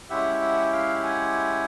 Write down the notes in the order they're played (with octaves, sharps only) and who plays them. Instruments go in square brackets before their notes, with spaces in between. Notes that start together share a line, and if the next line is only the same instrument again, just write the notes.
[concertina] G#3 C#4 E4 G4 E5 F#5
E5 F#5
F5 G5
F#5 G#5